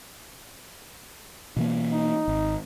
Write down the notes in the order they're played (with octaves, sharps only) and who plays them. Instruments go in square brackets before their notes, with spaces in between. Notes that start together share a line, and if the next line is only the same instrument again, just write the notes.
[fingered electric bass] B2 E3 A#3
[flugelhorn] D#4
[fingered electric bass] G#1